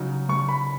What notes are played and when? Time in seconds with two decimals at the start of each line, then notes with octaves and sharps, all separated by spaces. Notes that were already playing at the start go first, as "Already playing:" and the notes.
Already playing: C#3 F#3 D#4
0.29 C#3 C#6
0.49 B5